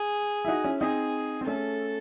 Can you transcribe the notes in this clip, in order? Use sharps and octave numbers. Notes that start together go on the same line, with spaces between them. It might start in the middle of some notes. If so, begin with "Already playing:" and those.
Already playing: G#4
E4
D#4 F#4
C#4 E4
C4 D#4 G#4
C4
A3 C#4 A4